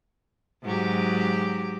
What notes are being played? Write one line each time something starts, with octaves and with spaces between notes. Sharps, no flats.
G#2 F#3 G4